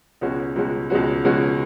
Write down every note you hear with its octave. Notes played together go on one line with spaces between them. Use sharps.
C#2 B2 G#3 C#4 F#4
C#2 B2 G#3 C#4 F#4
C#2 B2 G#3 C#4 F#4
C#2 B2 G#3 C#4 F#4